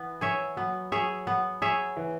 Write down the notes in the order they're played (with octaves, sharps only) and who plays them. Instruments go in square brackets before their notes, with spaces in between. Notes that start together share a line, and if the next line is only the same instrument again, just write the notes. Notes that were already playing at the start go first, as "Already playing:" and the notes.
Already playing: [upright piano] E3 [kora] B3
[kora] G#4 C#5 E5
[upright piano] F#3 [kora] B3
[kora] G#4 C#5 E5
B3
G#4 C#5 E5
[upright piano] E3